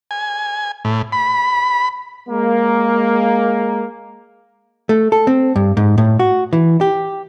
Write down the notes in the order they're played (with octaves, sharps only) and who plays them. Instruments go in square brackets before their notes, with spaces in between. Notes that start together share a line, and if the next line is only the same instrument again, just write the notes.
[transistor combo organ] G#5
A2
B5
[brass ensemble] G#3 A#3
[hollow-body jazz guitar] A3
A4
C4
G2
G#2
A2
F#4
E3
G4